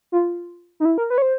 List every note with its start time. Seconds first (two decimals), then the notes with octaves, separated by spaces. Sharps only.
0.12 F4
0.80 D#4
0.85 E4
0.98 A#4
1.10 B4
1.18 C#5
1.22 C5